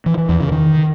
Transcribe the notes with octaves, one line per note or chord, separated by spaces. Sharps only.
E3
E3
E2
C#3
D#3